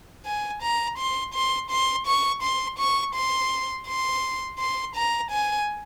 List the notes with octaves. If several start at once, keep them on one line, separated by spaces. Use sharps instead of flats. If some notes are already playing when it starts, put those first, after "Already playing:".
G#5
A#5
C6
C6
C6
C#6
C6
C#6
C6
C6
C6
A#5
G#5